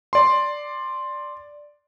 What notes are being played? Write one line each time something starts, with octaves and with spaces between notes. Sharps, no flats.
D5 C6